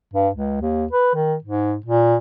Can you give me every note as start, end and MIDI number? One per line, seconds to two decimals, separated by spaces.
0.14 0.29 43
0.35 0.57 37
0.61 0.85 39
0.92 1.14 71
1.15 1.35 51
1.44 1.75 44
1.86 2.16 46